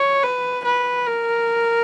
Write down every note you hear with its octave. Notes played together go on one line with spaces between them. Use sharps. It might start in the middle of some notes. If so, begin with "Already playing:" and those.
Already playing: C#5
B4
B4
A#4